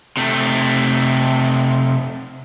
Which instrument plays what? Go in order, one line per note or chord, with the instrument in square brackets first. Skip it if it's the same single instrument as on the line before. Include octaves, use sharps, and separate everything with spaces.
[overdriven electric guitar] C3 A3